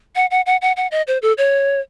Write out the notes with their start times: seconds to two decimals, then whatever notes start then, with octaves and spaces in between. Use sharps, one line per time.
0.16 F#5
0.31 F#5
0.46 F#5
0.62 F#5
0.77 F#5
0.91 D#5
1.07 C5
1.22 A4
1.38 C#5